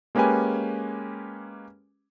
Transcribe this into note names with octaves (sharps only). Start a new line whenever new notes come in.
G#3 A#3 C#4 G4 B4 G#5